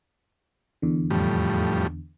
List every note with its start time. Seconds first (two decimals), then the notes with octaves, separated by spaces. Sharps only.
0.82 E2 D3
1.10 F2 A2 G3